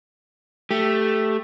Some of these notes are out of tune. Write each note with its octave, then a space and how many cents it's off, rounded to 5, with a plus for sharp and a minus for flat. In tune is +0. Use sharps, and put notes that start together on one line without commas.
A3 +0 G4 +0